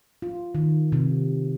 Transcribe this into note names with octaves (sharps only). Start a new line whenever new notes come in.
F4
D#3
C3